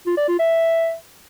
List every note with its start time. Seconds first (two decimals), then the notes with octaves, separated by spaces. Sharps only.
0.06 F4
0.17 D5
0.28 F4
0.39 E5